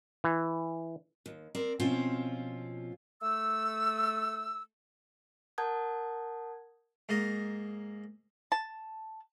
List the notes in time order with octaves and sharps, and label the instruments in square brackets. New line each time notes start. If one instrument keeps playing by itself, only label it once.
[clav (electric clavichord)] E3
[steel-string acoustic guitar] D#2
C4 A#4 D5
B2 F3 C4 C#4 F4
[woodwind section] A3 E6
[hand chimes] A#4 F#5 A5 D#6 G6 G#6
[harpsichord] G#2 A#3 D#5
[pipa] A5